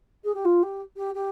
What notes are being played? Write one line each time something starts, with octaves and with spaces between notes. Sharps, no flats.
G#4
G4
F4
G4
G4
G4